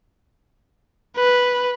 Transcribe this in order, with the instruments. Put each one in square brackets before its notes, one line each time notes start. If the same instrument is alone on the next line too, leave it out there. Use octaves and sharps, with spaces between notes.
[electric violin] B4